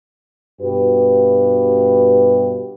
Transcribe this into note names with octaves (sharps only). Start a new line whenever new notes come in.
G2 B2 F#4 G4 B4